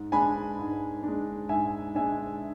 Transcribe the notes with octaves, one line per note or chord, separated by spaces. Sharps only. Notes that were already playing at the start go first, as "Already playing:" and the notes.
Already playing: G#2
G#3 D4 G#5 B5
G#2
G#3 D4
G#2 E5 G#5
G#3 D4 E5 G#5